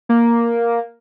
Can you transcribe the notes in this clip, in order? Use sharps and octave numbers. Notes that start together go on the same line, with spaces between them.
A#3